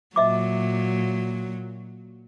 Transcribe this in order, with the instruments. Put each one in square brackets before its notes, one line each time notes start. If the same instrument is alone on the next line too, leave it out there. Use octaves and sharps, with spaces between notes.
[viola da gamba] A#2 F#3 [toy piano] D#5 E5 D6